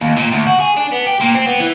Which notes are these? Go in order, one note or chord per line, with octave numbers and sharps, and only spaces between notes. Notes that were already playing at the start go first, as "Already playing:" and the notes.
D#2
A#2
D2
F#4
G#4
D4
B3
G4
A#2
C4
B3
E3